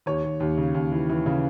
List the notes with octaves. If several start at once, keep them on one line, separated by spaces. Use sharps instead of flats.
D#2 C#5
D#2
D#2
C#3
D#2
E3
E3
C#3